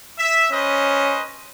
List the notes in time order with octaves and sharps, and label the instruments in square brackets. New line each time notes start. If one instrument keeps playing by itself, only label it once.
[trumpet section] E5
[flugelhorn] C#4 [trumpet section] B4 C5 D#5